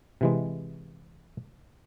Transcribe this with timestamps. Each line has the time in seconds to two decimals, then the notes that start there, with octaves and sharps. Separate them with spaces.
0.21 C3 E3 G#3